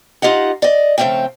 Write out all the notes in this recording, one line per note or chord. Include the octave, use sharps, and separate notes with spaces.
D#4 F4 G4 D#5 F#5
D5 D#5
C#3 F3 A3 A#3 C4 G5